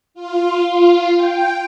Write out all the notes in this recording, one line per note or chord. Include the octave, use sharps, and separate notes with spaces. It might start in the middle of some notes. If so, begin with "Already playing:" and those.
F4
F4
G5